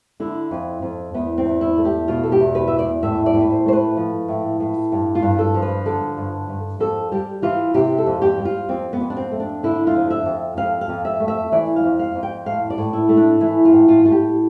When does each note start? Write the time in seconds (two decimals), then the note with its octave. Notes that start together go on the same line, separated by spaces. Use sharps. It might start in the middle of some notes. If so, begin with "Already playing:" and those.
0.20 D3 E4
0.51 F2
0.82 F2
1.14 E2 B3
1.38 C4
1.45 E2
1.61 E4
1.77 A3
1.85 G4
2.08 B2 F4
2.23 A4
2.32 G4
2.40 E2
2.55 B4
2.67 E2 E5
2.79 D5
3.03 A2 E5
3.26 D5
3.34 A2
3.41 B4
3.50 C5
3.66 A3 C5
3.73 B4
3.97 F3
4.28 A2
4.60 A2
4.92 G2
5.15 F4
5.22 G2
5.39 A4
5.54 F3
5.62 B4
5.86 D3 A4
6.17 G2
6.49 G2
6.80 F2 A4
7.12 G3 G4
7.42 E3 F4
7.74 C3 G4
7.98 A4
8.06 F2
8.22 G4
8.38 G3
8.45 F4
8.69 F2 C4
8.93 B3
9.00 F2
9.10 D4
9.17 C4
9.31 A3
9.40 D4
9.63 D3 E4
9.87 F4
9.94 F2
10.10 E5
10.26 F2
10.57 F2 F5
10.81 F5
10.89 F2
11.05 E5
11.20 A3
11.28 E5
11.52 E3 D5
11.76 F5
11.84 F2
11.99 F5
12.15 F2
12.23 G5
12.46 A2 F5
12.70 D5
12.78 A2
12.93 E4
13.09 A3
13.17 D4
13.41 E3 E4
13.65 F4
13.72 A2
13.88 F4
14.03 A2 F4
14.12 G4